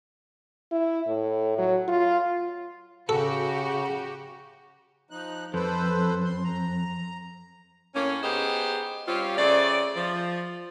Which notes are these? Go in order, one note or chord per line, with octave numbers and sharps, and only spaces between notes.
E4
A2
F#3
F4
C#3 F#4 G4 A4
F3 D#4 F#6
F2 A4 B4 C5
C6
A#5
A2 A#3 C#4
B3 D#4 G4 G#4 C5
G3 C4 C#4 F4
C#3 A3 C4 D5
F3